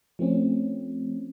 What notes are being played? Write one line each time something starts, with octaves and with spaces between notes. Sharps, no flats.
F3 A3 C4 C#4